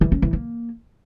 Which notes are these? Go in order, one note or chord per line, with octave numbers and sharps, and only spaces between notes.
E3
C#4
E3
A#3